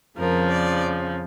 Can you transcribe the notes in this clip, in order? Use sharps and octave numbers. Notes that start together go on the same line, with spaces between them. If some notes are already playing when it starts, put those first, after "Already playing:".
F2 C#3 F3 A#4
D5